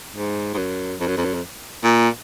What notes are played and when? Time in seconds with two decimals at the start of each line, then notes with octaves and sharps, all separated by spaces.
0.16 G#2
0.54 G#2
0.57 F#2
1.00 F2
1.08 F#2
1.17 F2
1.24 F#2
1.34 F2
1.83 A#2